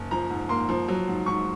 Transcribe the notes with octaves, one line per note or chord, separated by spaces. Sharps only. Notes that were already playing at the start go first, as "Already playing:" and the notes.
Already playing: F#1
F3 A#5
G#2
A#3 C6
F3
F#3
G#2
G#2 C#6